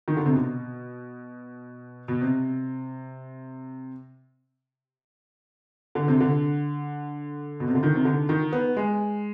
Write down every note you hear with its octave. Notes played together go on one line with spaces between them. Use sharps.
D#3
D3
C3
B2
B2
C3
D3
C3
D3
B2
C3
D3
D#3
C3
D3
D#3
B3
G#3